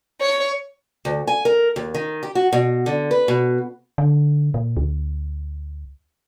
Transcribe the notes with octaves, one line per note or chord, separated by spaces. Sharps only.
C#5
D2
G#5
A#4
D#2
D#3
G4
F#4
B2
D3
B4
B2
D3
A#2
D2